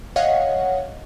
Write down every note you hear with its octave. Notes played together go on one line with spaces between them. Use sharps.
C#5 D#5 F5 F#5